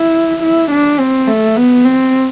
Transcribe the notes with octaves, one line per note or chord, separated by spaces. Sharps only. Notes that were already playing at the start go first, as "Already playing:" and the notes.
Already playing: E4
E4
D4
C4
A3
B3
C4